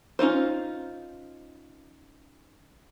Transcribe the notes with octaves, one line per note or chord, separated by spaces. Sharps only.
C#4 D#4 F4 C5